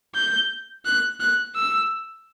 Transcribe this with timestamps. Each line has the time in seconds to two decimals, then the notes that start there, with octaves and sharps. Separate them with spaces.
0.15 G6
0.85 F#6
1.20 F#6
1.56 E6